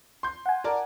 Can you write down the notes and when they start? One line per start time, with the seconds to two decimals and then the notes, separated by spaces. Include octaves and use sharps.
0.23 C6 G6
0.46 F#5 G#5
0.64 A#4 D5 A5